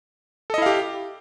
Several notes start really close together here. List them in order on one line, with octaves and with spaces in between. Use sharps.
A4 D#5 E4 F5 G4